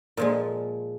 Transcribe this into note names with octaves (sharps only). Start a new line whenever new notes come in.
A#2 F3 G#3